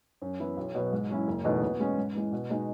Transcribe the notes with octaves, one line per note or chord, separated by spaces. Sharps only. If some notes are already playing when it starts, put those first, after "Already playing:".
F#2
E3 B3 E4
B1
B2 F#3 B3
G#2
F#3 C#4 E4
F#1
E2 B2 A3 D#4
B2
G#3 C#4
G#2
E3 G#3
B2
G#3 D#4 F#4